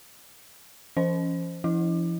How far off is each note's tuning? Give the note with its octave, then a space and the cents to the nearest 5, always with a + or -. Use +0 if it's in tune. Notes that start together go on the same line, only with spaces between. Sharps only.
F3 -45 C#4 +0 C5 +0
F3 -40 E4 -15